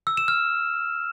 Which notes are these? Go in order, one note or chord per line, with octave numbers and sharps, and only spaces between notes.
E6
E7
F6